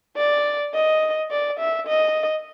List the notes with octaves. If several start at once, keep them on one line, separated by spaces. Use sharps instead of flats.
D5
D#5
D5
E5
D#5